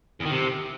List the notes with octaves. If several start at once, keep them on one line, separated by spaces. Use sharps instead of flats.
E2
D#3
C3